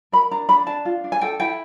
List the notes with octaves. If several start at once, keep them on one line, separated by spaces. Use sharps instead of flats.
A#4 B5
D4 A#5
D4 B5
D4 A5
F4
D4
G#5
A4 G5
E4 G5